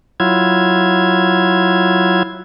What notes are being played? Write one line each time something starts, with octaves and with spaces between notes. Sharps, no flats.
F#3 E4 F4 G#6